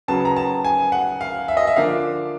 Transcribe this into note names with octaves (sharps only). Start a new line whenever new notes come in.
C#3 F#3 B3 A5
A#5
A5
G#5
F#5
F5
E5
D#5
E5
D3 F3 A#3 D4 F5